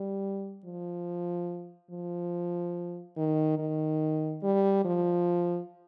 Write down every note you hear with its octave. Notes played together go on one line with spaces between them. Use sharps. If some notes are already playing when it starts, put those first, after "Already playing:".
Already playing: G3
F3
F3
D#3
D#3
G3
F3